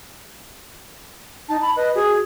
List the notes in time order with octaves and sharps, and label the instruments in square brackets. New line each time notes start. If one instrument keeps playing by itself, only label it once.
[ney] D#4 [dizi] A5
[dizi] A5 [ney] B5
[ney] B4 [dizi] D#5
[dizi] F#4 [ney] G#4